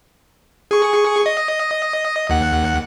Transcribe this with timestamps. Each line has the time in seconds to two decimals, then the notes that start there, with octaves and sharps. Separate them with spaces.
0.71 G#4 C#6
1.26 D#5
2.30 D#2 F#5